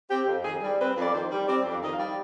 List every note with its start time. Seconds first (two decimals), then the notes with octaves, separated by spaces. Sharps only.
0.10 C4 G4
0.28 F2
0.45 D#3 G#4
0.63 G3
0.80 C4 B4
0.96 F2
1.02 D5
1.14 D#3 C5
1.31 G3
1.47 C4 D5
1.65 F2
1.71 D5
1.82 D#3 D#5
1.93 F5
1.99 G3